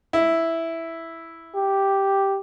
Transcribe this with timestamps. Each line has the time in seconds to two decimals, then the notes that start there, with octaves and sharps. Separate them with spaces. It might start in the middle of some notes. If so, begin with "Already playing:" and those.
0.13 E4
1.55 G4